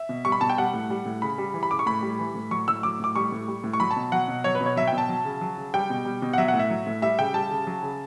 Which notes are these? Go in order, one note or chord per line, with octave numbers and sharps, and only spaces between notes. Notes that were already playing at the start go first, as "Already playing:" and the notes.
Already playing: E5
B2
G3 C#6
B5
B2 A5
G5
G3 F#5
A2
G3
A2
C#3 B5
G3
E3
B5
C#3 D6
C#6
A2 B5
G3
E3
A2
F#3 C#6
A2 E6
F#3 D6
A2 D6
G3 C#6
A2
G3
A2
C#6
F#3 B5
A5
B2
F#3 F#5
B2
F#3 C#5
B4
B2
C#5
F#3 E5
G5
B2
A5
F#3
C#3
F#3
C#3
G3 G5
B2
G3
B2
F#5
F#3 E5
F#5
A2
E5
F#3
A2
G3 E5
C#3 G5
G3 A5
C#3
F#3
C#3